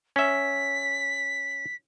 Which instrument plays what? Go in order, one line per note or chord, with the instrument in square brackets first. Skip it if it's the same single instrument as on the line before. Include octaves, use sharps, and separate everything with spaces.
[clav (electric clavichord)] C#4 E5 [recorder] B6